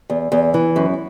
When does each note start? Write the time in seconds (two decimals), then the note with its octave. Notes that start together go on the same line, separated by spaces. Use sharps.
0.10 E2
0.32 E2
0.54 E3
0.76 F#2